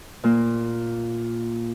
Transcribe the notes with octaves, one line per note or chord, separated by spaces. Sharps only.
A#2 A#3